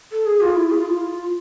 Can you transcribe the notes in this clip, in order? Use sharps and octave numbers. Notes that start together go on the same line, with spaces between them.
A4
G#4
F4
E4
G#4
F4
E4
F4